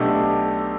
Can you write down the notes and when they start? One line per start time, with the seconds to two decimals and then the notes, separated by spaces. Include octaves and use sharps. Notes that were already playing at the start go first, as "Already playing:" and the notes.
Already playing: B1 B2 A3 D4 G4